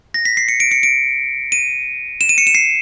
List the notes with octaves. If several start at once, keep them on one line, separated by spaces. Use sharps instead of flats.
A#6
B6
C7
C#7
D7
C#7
D7
D#7
E7
D#7
C#7
E7
C7